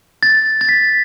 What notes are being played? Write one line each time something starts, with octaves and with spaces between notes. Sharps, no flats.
A6
A6
B6